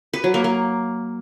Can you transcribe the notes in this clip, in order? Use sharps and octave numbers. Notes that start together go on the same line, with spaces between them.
B4
F#3
A#3
A#3